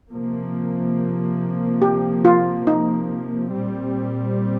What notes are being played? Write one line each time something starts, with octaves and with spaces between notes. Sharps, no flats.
C3 F3 A#3
G4
F4
D#4
A#2 G3 C4